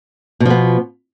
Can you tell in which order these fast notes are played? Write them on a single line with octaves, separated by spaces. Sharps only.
B2 F3 B3